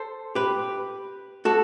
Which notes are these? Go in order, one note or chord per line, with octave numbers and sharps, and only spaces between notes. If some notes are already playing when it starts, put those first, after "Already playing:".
Already playing: A4 C5
G4 B4
F#4 A4